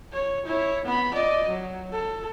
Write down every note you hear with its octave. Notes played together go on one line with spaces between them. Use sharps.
C#5
E4 C#5
B3 B5
D5 D#5
F#3
A4